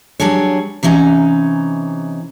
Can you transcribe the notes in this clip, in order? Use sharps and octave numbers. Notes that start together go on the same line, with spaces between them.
F#3 G3 D4 G#4 C#5
C3 E3 C#4 D#4 A#5